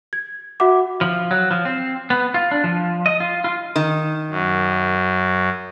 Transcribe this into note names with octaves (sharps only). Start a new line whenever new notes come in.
G#6
F#4 E5 F#5 D6
F3
F#3
F3
C4
B3
F4
D4
F3
D#5
F4
F4
D#3
F#2